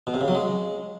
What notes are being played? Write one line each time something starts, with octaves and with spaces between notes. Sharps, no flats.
B2
C3
C#3
F#3
G#3